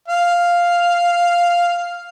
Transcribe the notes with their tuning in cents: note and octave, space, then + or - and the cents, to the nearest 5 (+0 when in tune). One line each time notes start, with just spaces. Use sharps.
F5 +0